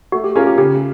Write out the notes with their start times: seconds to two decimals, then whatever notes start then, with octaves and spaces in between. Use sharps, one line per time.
0.12 A3 F#4
0.24 G4
0.35 C#4 F4 G#4 A#4
0.47 G4
0.58 C#3 G4